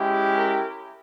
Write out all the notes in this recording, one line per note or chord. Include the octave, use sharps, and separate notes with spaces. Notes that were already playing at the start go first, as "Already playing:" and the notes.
Already playing: G#3 C#4 E4 G4
A#4